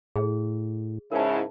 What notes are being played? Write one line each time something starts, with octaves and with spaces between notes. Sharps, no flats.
A2 G#4
G#2 C#3 E4 A#4 A5